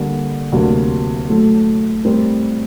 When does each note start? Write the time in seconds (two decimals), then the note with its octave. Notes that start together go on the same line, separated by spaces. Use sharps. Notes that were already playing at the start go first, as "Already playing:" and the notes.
Already playing: D3 G3 A#3
0.52 D2 C3 F#3 A#3 F#4
1.29 A2 F#3 A3
2.05 A2 G3 C4 G4 A#4